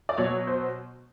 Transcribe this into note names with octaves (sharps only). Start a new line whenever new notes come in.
D5
B2 F#3 C#5
C5